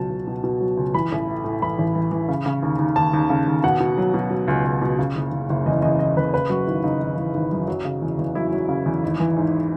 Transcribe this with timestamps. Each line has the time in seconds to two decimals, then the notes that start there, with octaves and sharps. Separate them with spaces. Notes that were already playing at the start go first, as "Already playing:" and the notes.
Already playing: C#2 B2 F#3 A5
0.10 C#2
0.27 B2
0.44 B2
0.61 F#3
0.77 C#2
0.94 E3 B5
1.12 A1
1.27 A2
1.44 A2
1.62 E3 B5
1.78 A1
1.95 E3
2.12 E3
2.29 C#3
2.46 C#3
2.63 D#2
2.79 D#2
2.96 D#2 A5
3.13 D#2
3.30 C#3
3.48 D#2
3.64 B2 F#5
3.80 B2
3.98 F#3
4.14 B2
4.31 F#3
4.48 C#2
4.65 C#2
4.82 B2
4.99 C#3
5.16 F#1
5.32 F#1
5.50 F#1
5.66 E2 D#5
5.82 E2 D#5
5.99 E2 D#5
6.17 F#1 B4
6.33 C#3 B4
6.50 F#2 F#4
6.67 G#1 E4
6.84 C#3 D#4
7.01 G#1
7.17 E3
7.34 G#1
7.52 F#2
7.68 F#3
7.85 C#3
8.02 E2
8.19 E2
8.35 F#3 E4
8.53 F#3
8.69 C#3
8.86 E2
9.03 G#1
9.20 E3
9.37 G#2